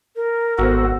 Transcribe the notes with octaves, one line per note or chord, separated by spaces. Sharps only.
A#4
G#1 B3 F#4 A4 C5